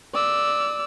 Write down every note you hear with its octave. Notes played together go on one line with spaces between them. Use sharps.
D5 E6